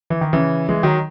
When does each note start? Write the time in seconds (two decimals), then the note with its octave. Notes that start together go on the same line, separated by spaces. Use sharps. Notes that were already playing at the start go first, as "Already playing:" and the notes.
0.10 E3
0.21 D#3
0.33 C#3 E3
0.69 E3 G#3
0.83 D#3 F#3